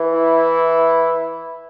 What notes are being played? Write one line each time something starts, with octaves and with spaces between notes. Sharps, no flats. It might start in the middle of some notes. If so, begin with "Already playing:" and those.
Already playing: E3
E4